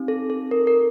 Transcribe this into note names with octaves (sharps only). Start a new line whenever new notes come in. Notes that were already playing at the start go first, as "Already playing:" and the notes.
Already playing: C4 D#4 G4
A4
A4
A#4
A#4